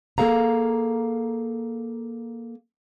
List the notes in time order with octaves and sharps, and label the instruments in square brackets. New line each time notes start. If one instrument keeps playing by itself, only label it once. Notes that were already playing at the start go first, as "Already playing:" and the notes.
[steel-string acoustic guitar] A#3 G#4 A4 F5 A#5